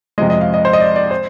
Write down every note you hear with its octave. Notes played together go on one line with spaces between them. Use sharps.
F2 C3 F3 G#3 D#5
D#5
F5
D#5
C5
D#5
D5
D5
C5